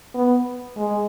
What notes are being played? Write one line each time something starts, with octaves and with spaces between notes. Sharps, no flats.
B3
G#3